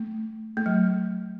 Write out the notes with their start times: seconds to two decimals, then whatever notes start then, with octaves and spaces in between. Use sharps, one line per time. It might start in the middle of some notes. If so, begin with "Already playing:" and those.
Already playing: A3
0.57 A3
0.66 F#3